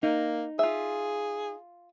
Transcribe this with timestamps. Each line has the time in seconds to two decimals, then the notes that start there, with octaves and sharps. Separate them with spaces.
0.03 A#3 D#4
0.59 F4 G#4 E5